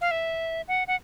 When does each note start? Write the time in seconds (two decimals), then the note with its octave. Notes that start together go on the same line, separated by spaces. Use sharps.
0.01 F5
0.11 E5
0.68 F#5
0.88 F#5